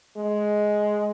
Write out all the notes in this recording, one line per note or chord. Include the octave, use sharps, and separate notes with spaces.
G#3